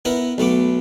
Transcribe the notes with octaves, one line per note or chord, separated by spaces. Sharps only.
B3 E4 A#4 B4
B1 A3 B3 D6